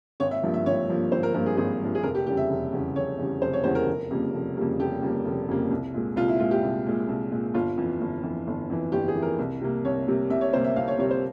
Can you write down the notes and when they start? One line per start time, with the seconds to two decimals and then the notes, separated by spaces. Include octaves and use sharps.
0.20 G#1 C#5
0.31 E5
0.43 G2 F3 A#3
0.54 E5
0.66 G#1 C#5
0.89 G2 F3 A#3
1.12 G#1 C5
1.23 A#4
1.34 G2 F3 A#3 A#4
1.46 G#4
1.57 G#1 G#4
1.80 G2 F3 A#3
1.95 G#4
2.03 F1 A#4
2.15 G4
2.26 E2 C#3 G3 G4
2.37 E5
2.50 F1
2.73 E2 C#3 G3
2.95 F1 C#5
3.18 E2 C#3 G3
3.42 F1 C5
3.53 C#5
3.64 E2 C#3 G3 C5
3.75 A#4
3.87 F1
4.11 F2 C#3 G3 A#3
4.34 F1
4.57 F2 C#3 G3 A#3
4.79 F1 G4
5.02 F2 C#3 G3 A#3
5.25 F1
5.49 F2 C#3 G3 A#3
5.71 C2
5.94 A#2 G#3
6.16 C2 F4
6.28 E4
6.40 A#2 G#3 F4
6.51 G4
6.63 C2
6.86 A#2 G#3
7.09 C2
7.32 A#2 G#3
7.54 G1 F4
7.78 F2 E3
8.01 G1
8.23 F2 E3
8.47 G1
8.70 F2 E3
8.92 G1 G4
9.08 G#4
9.15 F2 E3
9.23 A#4
9.39 C2
9.62 C3 G3 A#3
9.85 C2 C#5
10.07 C3 G3 A#3
10.30 C2 E5
10.41 C#5
10.53 C3 G3 A#3 C5
10.64 E5
10.76 C2 F5
10.88 C#5
10.99 C3 G3 A#3 C#5
11.11 C5